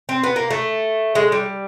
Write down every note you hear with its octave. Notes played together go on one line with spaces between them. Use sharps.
C4
B3
A#3
A3
G#3
G3